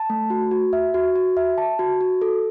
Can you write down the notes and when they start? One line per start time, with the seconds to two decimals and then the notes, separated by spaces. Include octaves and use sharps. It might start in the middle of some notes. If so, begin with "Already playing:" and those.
Already playing: A5
0.10 A3
0.30 F#4
0.51 F#4
0.73 E5
0.94 F#4
1.16 F#4
1.37 E5
1.58 A5
1.79 F#4
2.01 F#4
2.22 A4